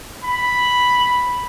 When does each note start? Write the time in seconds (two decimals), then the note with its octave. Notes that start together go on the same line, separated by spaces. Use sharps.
0.24 B5